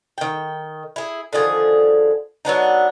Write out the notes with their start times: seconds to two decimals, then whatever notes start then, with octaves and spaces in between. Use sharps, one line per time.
0.18 D#3 G5
0.96 E4 G#4
1.33 D3 D#3 F3 G#4
2.45 F#3 B3 D4 D#4